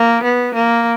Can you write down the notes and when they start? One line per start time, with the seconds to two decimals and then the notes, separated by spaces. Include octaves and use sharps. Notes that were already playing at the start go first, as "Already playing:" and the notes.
Already playing: A#3
0.23 B3
0.55 A#3